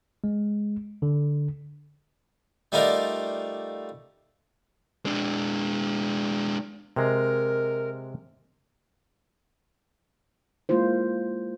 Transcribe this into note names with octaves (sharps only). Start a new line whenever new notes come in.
G#3
D3
G3 A3 D#4 F4 A#4 D5
G#3 D4
C3 G#3 A#4
G#3 A#3 E4 F4 C5